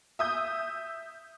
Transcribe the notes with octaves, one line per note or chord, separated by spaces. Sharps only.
E5 D#6 G6